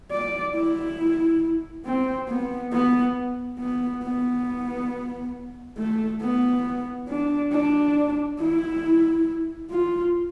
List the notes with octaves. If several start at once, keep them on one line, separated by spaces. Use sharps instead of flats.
D5
E4
C4
B3
B3
B3
B3
A3
B3
D4
D4
E4
F4